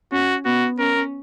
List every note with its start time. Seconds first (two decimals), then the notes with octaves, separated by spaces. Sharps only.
0.12 C#4 F#4
0.45 B3 F#4
0.79 C#4 A#4